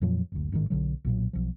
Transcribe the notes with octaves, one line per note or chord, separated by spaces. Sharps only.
F2 A#2 F3 F#3
F#1 D2
A1 G#2 C3 D#3
B1 D3 F#3
B1 A#2 F#3
B1 F3